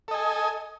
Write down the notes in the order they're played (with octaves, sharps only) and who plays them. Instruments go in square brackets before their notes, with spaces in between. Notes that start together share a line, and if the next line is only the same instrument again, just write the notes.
[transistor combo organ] A4
D#5
G#5